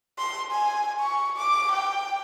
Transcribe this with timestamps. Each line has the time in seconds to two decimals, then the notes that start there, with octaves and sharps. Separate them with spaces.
0.18 C6
0.52 G#5
0.99 C#6
1.37 D6
1.71 G5